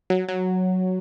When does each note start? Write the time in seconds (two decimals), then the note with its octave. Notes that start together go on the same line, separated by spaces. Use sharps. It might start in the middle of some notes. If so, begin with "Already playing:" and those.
0.10 F#3
0.28 F#3